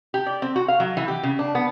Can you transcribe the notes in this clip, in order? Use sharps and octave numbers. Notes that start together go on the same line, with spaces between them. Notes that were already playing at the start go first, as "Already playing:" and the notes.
G4
D5
C4
F#4
F5
F#3
E3
G4
C#3
D4
B3